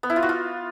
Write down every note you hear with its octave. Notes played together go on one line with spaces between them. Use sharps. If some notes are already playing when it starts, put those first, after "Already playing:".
B3
E4
F4
F#4
F4